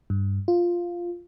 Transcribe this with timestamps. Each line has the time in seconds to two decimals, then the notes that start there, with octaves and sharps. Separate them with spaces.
0.10 G2
0.48 F4